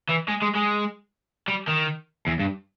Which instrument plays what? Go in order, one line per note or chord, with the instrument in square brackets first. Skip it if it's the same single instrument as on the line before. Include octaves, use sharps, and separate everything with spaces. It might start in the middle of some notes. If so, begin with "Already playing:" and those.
[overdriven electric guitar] E3
G#3
G#3
G#3
G3
D#3
E2
G2